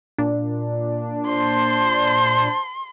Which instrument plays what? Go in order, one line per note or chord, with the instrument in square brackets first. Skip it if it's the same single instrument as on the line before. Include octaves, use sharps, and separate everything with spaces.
[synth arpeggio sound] A#2 D4
[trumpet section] C5 A5 [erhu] C6